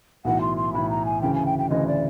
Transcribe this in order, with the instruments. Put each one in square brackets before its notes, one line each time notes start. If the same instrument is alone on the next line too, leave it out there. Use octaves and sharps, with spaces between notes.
[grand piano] B1 A2 E3 [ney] F#5
[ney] C6
C6
[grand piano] B1 A2 E3 [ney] B5
[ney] A#5
G#5
[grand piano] D2 C#3 E3 [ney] G5
[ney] G#5
G5
G5
[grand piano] D2 C#3 E3 [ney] D#5
[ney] D5